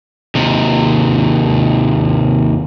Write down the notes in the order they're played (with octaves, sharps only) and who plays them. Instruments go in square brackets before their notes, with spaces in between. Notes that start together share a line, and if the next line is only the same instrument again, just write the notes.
[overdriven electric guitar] D#2 C3